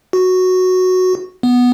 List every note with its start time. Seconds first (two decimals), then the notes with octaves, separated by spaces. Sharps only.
0.13 F#4
1.43 B3